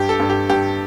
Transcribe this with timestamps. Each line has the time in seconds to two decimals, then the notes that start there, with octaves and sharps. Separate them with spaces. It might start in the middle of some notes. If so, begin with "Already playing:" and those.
Already playing: G2 G4
0.09 A4
0.19 G2
0.30 G4
0.49 G2 G4